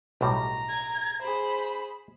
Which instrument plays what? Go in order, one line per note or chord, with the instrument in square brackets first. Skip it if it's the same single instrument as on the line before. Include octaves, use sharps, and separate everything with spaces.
[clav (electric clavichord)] B1 A2 G3 [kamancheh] A#5
[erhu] G#6
[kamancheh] G#4 C5 [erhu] B5